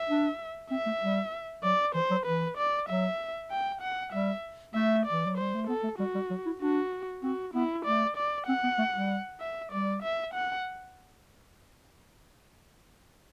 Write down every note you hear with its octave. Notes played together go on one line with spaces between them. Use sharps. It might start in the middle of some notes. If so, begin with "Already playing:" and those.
Already playing: E5
D4
C4 E5
A3
G3
F#3 D5
E3 C5
F#3
E3 B4
D5
F#3 E5
G5
F#5
G3 E5
A3 E5
D5
E3
F#3
G3 C5
A3
B3 A4
A3
G3 F#4
G3
F#3
E4
D4 F#4
C4 F#4
B3 E4
A3 D5
D5
C4 F#5
B3
A3
G3
E5
G3 D5
E5
F#5